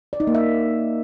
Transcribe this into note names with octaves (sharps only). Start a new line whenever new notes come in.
D5
D#4
A#3
E5